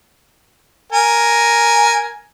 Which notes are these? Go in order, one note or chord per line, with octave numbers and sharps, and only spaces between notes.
A#4 G#5